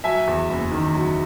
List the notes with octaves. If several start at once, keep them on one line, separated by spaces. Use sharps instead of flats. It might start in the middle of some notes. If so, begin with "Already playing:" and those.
F#3 E5 G#5
E2
F#1
D#3
F#3